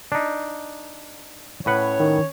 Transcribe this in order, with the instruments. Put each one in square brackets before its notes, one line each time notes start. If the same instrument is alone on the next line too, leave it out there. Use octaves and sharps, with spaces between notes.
[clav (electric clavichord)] D4 D#4
[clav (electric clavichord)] A2 B4 F#5 [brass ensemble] C#4 C#5
[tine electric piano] D#3